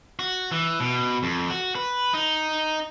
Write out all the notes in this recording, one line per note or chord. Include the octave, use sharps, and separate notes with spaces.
F#4
E3
B2
F2
F#4
B4
D#4